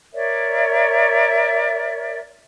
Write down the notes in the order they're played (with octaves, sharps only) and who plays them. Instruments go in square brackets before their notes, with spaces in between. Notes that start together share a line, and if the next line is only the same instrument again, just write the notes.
[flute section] A#4 C#5 D5 E5